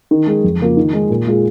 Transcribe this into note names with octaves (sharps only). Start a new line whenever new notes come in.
D#3
G#3 D#4 G#4
F2
C#3 A#3 F4
D#3
G#3 D#4 G#4
A#2
G#3 F4 G#4